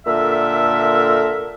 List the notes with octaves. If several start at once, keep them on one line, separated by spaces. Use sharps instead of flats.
A#2 D3 A4 A#4 E5